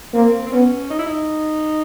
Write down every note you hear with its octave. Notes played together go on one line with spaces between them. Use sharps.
A#3 C4
C4
B3 C#4
D#4
E4
D#4